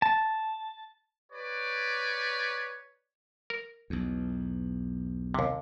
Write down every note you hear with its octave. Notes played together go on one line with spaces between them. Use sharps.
A5
G4 B4 C#5 D5
A#4
B1 E2
D#2 C3